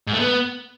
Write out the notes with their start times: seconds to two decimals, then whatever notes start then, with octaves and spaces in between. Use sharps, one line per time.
0.07 G#2
0.14 A3
0.20 B3